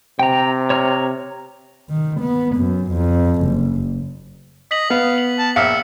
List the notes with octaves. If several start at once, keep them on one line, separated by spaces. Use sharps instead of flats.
C3 G5 A#5
C#5 A#5 F6
D#3
B3
F#2
F2
F#1
D#5 B6 F#7
B3 F5
F#7
A5
A#1 E5 F5 C#7